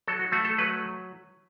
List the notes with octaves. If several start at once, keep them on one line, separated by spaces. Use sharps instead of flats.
F#3 A4
F#4
A3 F#4
A4
F#3 B4